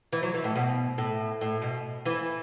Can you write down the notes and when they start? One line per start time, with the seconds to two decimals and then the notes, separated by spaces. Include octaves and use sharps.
0.13 E3
0.23 F#3
0.34 E3
0.44 A2
0.55 B2
0.98 A2
1.41 A2
1.62 B2
2.05 E3